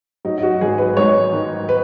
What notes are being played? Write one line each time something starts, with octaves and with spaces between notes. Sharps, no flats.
F#3 D#4
D#4
F#4
G#1 G#4
B4
G#2 C#5
D#3
B4